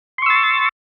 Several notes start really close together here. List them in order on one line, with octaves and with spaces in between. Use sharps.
C6 C#6 E6 A6